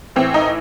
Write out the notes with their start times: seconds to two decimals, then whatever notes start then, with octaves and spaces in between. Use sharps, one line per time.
0.16 A2 E3 C4
0.34 D#4